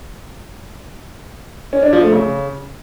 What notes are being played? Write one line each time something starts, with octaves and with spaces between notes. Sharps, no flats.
C#4
D4
F3
A3
C#3